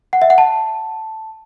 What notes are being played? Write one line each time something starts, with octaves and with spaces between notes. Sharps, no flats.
F#5
E5
F#5
A5